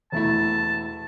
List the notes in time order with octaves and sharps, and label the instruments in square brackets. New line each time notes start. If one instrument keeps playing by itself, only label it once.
[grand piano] E1 A3 E4 [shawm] A5